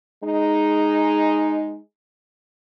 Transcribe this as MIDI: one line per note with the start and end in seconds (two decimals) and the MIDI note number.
0.24 1.79 56
0.24 1.79 63